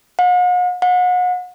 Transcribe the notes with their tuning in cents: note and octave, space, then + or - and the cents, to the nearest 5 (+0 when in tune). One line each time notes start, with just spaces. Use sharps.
F#5 -45
F#5 -35